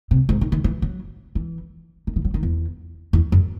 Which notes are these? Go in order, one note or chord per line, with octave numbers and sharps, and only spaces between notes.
C3
G#2
D#3
D#3
E3
F#3
E3
D#3
E3
F#3
D#3
E2
E2
F#2